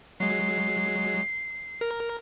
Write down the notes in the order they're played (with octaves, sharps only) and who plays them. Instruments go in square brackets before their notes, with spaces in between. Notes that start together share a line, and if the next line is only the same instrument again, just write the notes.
[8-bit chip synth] F#3 G#3 [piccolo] C7
[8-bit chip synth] A#4